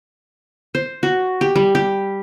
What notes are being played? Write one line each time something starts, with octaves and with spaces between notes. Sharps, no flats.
C5
F#4
G4
G3
G4